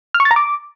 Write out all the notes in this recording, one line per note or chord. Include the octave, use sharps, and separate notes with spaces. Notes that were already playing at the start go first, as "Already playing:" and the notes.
F6
C#6
A6
A#5
D6